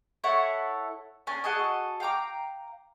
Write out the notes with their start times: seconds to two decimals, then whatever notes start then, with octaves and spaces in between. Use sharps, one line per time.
0.24 E4 A4 C#5 F#5
1.27 C#4 D4 G#5
1.44 F#4 G#4 A4 D#5
2.00 F5 G5 A#5 D6